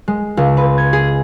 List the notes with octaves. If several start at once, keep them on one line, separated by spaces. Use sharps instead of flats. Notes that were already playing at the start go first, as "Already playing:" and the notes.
G#3
C#2
B4
G#6
G#4